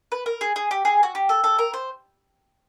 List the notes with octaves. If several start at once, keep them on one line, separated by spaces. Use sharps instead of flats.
B4
A#4
G#4
G#4
G4
G#4
F#4
G4
A4
A4
A#4
C5